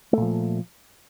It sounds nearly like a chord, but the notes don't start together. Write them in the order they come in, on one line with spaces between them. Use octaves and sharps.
A3 A#2 F3